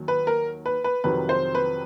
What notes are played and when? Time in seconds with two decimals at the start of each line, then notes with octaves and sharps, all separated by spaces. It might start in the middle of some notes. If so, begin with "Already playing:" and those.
Already playing: D#2 D#3 F#3
0.08 B4
0.27 A#4
0.66 B4
0.84 B4
1.04 F2 C3 D#3 F#3 B4
1.29 C5
1.55 B4